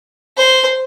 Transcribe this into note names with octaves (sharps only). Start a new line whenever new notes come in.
C5